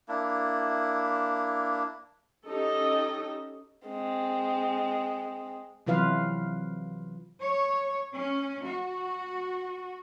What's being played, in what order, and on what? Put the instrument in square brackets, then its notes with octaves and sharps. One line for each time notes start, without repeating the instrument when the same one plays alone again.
[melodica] A#3 D4 E4
[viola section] C#4 D#4 G4 A4 D#5
[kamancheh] G#3 C4
[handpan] C3 E3 F#3 F4 B4 F5
[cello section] C#5
C#4
F#4